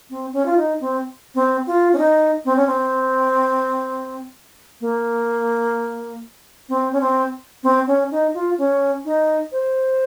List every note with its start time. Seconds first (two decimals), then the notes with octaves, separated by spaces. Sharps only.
0.10 C4
0.33 C#4
0.46 F4
0.57 D#4
0.81 C4
1.35 C4
1.67 F4
1.93 C#4
1.98 D#4
2.45 C4
2.56 C#4
2.67 C4
4.81 A#3
6.69 C4
6.93 C#4
7.01 C4
7.63 C4
7.87 C#4
8.11 D#4
8.34 F4
8.58 C#4
9.05 D#4
9.52 C5